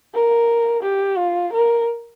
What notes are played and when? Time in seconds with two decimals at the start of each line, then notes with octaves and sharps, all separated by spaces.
0.14 A#4
0.83 G4
1.18 F4
1.53 A#4